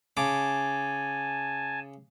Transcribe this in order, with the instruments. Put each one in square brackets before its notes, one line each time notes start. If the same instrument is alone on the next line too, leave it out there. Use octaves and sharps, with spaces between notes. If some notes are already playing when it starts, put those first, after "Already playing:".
[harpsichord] C#3 D6 [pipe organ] G#5 A5